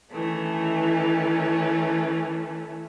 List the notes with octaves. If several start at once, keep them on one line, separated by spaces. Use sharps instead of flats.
D#3 E3 A3 C#4